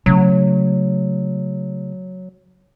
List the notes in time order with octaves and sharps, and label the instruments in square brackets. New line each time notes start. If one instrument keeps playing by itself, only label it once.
[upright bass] C#3 A3 [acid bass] F#3